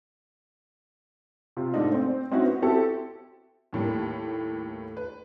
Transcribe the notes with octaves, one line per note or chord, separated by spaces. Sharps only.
C3 F4
G#2 A3 D4 D#4
C4 C5
C4 C#4 D#4 E4 F#4
B3
C4 E4 F#4 G4 A4
D#2 A2 G3 A#3
B4